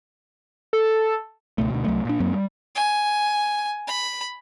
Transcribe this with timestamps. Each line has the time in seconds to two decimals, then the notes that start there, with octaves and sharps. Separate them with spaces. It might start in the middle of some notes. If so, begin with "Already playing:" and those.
0.73 A4
1.58 C#2 B2 A3
1.70 D2 B2
1.84 C2 F#3 A3
2.05 A#2 D4
2.20 F#2 F#3 A#3 C4
2.33 G3
2.75 G#5
3.87 B5